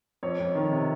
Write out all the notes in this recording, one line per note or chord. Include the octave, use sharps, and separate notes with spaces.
F2 C#5
F2
D#3
C3